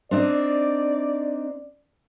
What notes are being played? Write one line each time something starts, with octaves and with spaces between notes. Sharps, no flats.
C4 D4 D#4 D5